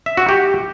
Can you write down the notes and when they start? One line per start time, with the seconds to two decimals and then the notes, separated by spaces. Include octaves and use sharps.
0.06 E5
0.17 F#4
0.29 G4